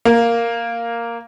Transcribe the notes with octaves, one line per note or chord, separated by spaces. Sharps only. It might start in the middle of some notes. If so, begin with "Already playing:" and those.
A#3